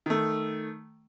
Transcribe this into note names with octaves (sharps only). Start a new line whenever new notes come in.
D#3 A3